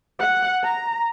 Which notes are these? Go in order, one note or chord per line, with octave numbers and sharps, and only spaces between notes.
F#5
A#5